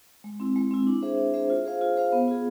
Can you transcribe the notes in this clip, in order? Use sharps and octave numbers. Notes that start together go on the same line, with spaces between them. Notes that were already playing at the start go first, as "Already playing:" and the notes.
G#3
C4 E4
G#3
C4 E4
D4
G#4 C5 E5
D4
G#4 C5 E5
F4
G#4 C5 F5
F4
G#4 C5 F5
B3
F4 G#4